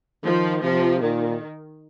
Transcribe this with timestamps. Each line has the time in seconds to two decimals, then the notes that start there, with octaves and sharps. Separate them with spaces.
0.24 D#3 F3
0.63 C3 F3
1.01 A#2 D#3